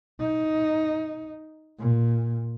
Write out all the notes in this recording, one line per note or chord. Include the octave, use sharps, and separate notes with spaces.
D#4
A#2